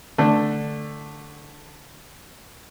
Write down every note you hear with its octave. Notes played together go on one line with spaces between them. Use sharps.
D3 A3